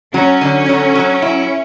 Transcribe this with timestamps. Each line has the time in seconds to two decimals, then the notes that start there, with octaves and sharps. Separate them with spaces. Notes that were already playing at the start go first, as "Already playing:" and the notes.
0.14 F#3 C#4
0.41 D3
0.69 F#3
0.95 F#3
1.22 E4